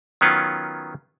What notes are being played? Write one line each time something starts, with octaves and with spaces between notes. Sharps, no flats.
D#3 F#3 B3 C#4 F4